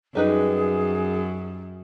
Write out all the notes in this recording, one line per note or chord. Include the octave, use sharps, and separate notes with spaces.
F#2 G3 D#4 G#4 B4